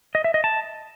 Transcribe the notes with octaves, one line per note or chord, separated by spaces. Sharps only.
D#5
E5
D#5
A5